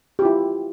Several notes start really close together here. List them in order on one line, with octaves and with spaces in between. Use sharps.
G4 F4 E4